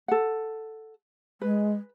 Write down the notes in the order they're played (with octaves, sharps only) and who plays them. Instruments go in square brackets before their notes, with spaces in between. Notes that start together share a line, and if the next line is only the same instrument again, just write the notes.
[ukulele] A4 F#5
[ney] G#3 [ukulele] B4